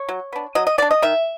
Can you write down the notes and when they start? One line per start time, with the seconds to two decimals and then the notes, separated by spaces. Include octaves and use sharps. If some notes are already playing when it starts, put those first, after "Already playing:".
Already playing: C#5
0.09 F#3
0.33 B3 D4
0.55 F#3 D#5
0.67 D#5
0.78 B3 D4 D5
0.91 D#5
1.02 D#3 E5